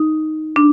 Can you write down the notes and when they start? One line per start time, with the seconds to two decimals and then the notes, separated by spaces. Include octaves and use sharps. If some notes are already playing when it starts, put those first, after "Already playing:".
Already playing: D#4
0.56 D4